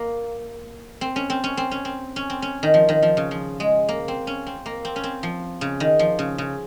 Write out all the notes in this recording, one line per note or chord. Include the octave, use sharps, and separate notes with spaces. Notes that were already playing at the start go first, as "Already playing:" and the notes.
Already playing: A#3
C4
C#4
C4
C#4
C4
C#4
C4
C#4
C4
C#4
D#3
F3
D#3
F3
C#3
F3
G#3
A#3
C4
C#4
C4
A#3
C4
C#4
C4
F3
C#3
D#3
F3
C#3
C#3